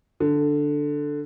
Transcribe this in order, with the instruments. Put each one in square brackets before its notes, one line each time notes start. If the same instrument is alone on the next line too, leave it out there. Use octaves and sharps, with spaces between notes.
[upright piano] D3